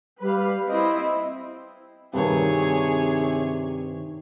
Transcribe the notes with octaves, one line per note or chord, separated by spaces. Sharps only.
G3 B4 F5
C4 E4 D#5
G2 C3 D#3 G#4 C#5